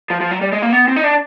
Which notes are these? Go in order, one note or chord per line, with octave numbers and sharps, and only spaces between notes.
F3
F3
F#3
G3
G#3
A#3
B3
C4
D#4
D4